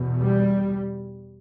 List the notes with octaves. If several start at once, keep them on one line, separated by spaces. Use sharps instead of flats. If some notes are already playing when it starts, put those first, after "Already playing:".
Already playing: E2 B2
G3